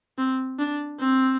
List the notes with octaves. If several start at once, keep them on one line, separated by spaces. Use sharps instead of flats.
C4
D4
C4